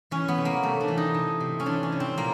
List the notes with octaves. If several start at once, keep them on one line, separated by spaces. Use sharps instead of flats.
E3 C#4
B3
C3
A#3
C3 A3
D4
E3
D#4
C3
C3
C#4
E3 D4
C#4
C3
C4
A#2 A#3